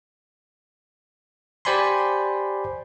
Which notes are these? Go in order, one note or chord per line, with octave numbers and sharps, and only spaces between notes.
G4 C5 D5 G#5 B5 C6